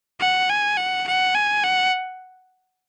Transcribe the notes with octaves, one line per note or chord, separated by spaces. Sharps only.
F#5
G#5
F#5
F#5
G#5
F#5